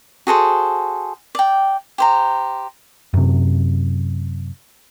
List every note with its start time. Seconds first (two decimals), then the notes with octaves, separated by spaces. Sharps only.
0.27 F#4 G#4 A4 C5
1.35 D5 G5
1.98 G4 C5 A#5
3.14 F#2 C3